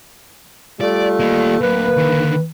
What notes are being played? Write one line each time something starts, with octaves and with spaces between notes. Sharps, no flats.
G3 A3 F4 D5
A#3 D#5
D2 F#3 A#3 B4
D3 D#3